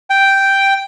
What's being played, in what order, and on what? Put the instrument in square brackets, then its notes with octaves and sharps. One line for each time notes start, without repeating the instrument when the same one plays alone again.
[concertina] G5